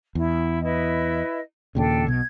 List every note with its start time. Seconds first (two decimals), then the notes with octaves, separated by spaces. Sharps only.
0.15 E2 E4
0.62 E4 B4 D#5
1.75 D#2 A#2 C#3 D4 A4 G5
2.07 B1 B2 G#6